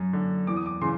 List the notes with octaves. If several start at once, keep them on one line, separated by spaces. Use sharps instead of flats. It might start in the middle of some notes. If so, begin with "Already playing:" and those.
Already playing: F#2
D3
E2 D6
D#6
D6
C#3 E3 C6